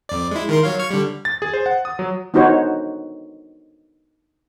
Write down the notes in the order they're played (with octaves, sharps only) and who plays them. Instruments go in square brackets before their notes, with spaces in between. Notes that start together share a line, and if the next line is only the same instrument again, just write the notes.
[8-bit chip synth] F2 D5
G#3 E4
D#3 A#4 C6
F#3 C#5 F5
C#6 F6 G#6
D3 G3
[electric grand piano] A6
G#4
C5
F#5
D#6
F#3
[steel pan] B3 D4 D#4 F#4 C5 C#5